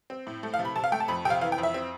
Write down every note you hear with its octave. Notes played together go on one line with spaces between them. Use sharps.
C4
A2
A3
F5
C3
B5
C3 A5
F5
A3 G5
A5
F2 B5
C3 G5
F5
E3 F5
G5
F2
E5
C4